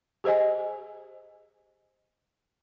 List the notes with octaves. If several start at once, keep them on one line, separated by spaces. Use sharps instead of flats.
G4 G#4 C5 D#5 G#5